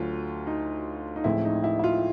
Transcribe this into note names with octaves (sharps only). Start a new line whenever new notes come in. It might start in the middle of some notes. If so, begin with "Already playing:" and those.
Already playing: D2 D3 F#3 F4
D#4
D#4
A1 A2 F3 G#3 C4 E4
D#4
E4
E4
F4